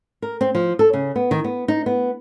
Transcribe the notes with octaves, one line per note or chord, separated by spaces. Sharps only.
A#4
C4
F3
A4
C#3
B3
D#3
B3
D#4
B3